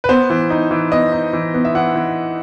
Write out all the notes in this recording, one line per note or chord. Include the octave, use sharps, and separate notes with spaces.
B4
B3 C5
E3
D#4
E3
B3 D#5
D#4
E3
B3
E5
E3 F#5
E3